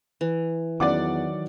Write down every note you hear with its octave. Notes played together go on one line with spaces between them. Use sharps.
E3
E2 D#3 F#3 D5 F#5 D6